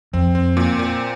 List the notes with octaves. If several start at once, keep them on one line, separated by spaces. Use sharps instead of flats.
F2 C4
C4
A#2
A#2